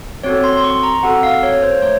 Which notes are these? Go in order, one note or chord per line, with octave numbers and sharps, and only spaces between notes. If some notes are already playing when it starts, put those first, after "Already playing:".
C4 F#4 A4 C#5
C6
C6
C#6
A#5
C4 F#4 A4 F#5
F5
C#5
C5
A3 C#5